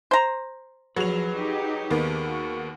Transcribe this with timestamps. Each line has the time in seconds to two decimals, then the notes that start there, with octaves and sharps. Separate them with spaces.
0.11 C5 A#5
0.96 F3 F#3 G#4 B4 F7
1.33 D#4 G4
1.91 D#2 A#3 B3
2.22 F#4